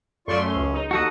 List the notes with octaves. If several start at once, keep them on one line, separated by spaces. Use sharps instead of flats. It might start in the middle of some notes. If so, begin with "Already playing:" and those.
F#2 A3 F4 D5 C6 C#6
C#4
C#2
D#4
D#2 F#4 A4 D#5 F#5